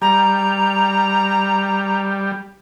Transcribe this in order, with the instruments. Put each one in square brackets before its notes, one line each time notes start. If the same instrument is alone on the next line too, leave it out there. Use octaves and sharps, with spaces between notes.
[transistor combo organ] G3 [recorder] A#5